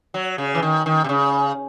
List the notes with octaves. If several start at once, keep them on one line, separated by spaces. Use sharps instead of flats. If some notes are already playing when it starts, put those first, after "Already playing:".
F#3
C#3
E3
D#3
D#3
C3
C#3